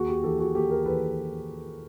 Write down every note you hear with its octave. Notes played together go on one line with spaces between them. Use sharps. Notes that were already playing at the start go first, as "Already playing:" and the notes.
Already playing: D#2 F#4 G#4
G4
E3 G4 A4
F#4 G#4
D#2 G4 A4
G#4 A#4
E3 A4 B4